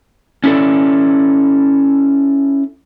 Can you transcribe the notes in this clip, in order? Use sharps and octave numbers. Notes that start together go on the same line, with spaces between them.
C#4 E4 F#4 A4 D5